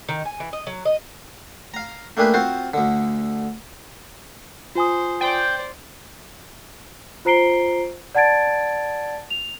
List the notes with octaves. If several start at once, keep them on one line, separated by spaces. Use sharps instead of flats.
D#3
G#5
E3
D#5
F#3
D#5
F5 A#5
A3 A#3 D4 G4 G#4 B4
C4 F4 F#4 C5
D2 D3
F4 C5 G#5 D#6
C5 D5 G5
F4 C5 A#5 C7 D7 G7
D5 F#5 A5 G#6 A6 D7
F7